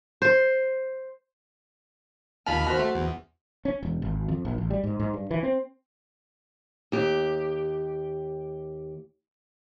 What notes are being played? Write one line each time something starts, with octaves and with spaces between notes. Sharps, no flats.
C5
D#2 F4 A5 B5 F6
F#4 C5
A3
E2
C#4
E1
G#1
F2
A#1
A1
G3
G#2
G#2
G2
E3
C4
D#2 G4